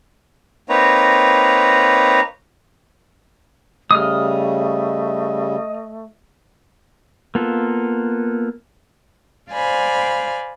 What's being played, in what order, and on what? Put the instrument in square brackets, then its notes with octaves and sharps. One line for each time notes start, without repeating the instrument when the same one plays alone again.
[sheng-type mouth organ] A#3 C4 D#4 B4 C#5 A#5
[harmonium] C#3 G3 [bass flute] A3 [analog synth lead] D#5 [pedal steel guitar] D#6 F6
[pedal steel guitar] A#3 B3 F4 A4
[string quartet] C5 D5 F5 G#5 B5